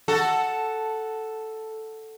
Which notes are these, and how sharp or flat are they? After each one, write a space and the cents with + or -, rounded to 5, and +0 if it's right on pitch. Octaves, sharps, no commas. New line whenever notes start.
F#4 +0 A4 +0